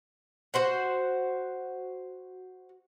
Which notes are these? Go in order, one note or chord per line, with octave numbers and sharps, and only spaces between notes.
F#4 C5 F#5